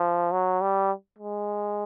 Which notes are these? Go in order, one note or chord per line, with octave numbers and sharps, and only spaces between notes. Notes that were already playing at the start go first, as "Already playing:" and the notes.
Already playing: F3
F#3
G3
G#3